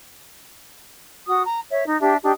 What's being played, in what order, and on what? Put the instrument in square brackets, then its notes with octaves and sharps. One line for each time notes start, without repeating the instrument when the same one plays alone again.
[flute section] F#4 D#6
A#5
C#5 E5
D#4
D4 G4 E5
D4 D#4 G4